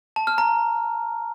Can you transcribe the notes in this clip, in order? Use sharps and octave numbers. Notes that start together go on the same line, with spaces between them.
A5
F6
A#5